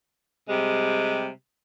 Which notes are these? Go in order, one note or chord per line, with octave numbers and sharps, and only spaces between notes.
C3 G3 G#3